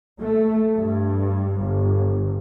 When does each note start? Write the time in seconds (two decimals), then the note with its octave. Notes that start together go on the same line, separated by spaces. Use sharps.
0.20 A3
0.76 G2
1.60 G1